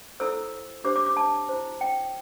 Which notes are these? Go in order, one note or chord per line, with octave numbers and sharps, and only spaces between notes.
E4 A4 C5 E6
D4 G4 C5 D6
D6
D6
A5
E4 C5
G5